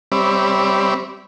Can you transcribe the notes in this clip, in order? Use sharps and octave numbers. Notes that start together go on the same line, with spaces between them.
G3 C4 C#5 D5 E5 B5